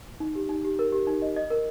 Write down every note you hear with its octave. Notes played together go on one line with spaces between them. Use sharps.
D#4
G4
D#4
G4
A#4
G4
D#4
D#5
D#5
A#4